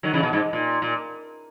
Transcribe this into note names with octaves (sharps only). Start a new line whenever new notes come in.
D#3 F#3
C#3 E3
B2
G#2
A#2
A#2